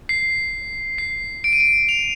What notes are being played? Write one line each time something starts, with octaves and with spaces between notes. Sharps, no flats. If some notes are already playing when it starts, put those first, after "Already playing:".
C7
C7
D7
D#7
D7
F7